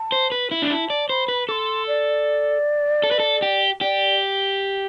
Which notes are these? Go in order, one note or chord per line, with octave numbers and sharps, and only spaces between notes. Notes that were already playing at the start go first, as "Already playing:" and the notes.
Already playing: A5
C5
B4
E4
D4
E4 A5
D5
C5 B5
B4
A4 C6 D6
D5
A4
B4
A4
G4
G4 D5